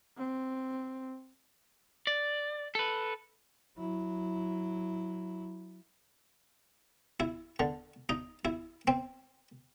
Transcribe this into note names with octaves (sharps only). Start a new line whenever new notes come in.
C4
D5
A4 B4
F#3 E4
E4
D3
D#4
E4
C4